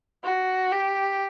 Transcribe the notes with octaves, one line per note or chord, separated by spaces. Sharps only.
F#4
G4